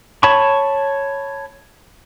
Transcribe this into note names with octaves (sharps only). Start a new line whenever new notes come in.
C#5 A5 B5 C#6